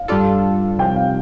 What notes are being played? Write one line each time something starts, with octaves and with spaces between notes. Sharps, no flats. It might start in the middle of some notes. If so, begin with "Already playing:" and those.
Already playing: F5
G2 G3 D4 F4 A4
C2 C3 F3 G5
F5